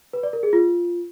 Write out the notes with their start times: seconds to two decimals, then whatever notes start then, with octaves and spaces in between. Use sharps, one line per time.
0.13 B4
0.23 D5
0.33 A#4
0.43 G#4
0.53 F4